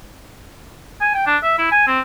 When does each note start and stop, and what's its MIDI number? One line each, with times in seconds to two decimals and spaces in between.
1.00 1.13 80
1.14 1.23 79
1.26 1.37 62
1.43 1.56 76
1.58 1.69 64
1.71 1.85 80
1.87 2.00 60